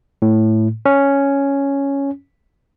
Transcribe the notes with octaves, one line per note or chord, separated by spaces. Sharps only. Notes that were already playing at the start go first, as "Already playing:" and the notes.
A2
C#4